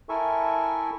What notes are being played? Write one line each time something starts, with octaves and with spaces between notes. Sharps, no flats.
E4 A4 A#4 E5 G#5 C#6